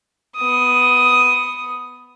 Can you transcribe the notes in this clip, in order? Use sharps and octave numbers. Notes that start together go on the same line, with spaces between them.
B3 D#6